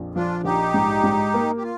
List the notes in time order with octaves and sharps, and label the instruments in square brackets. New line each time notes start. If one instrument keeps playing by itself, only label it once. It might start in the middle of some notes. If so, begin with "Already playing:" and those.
Already playing: [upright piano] A#1 F2
[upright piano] F3 [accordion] D4 F4
[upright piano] A#1 [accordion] D#4 G4
[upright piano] G#2
G#2
A#3
[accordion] G4
F4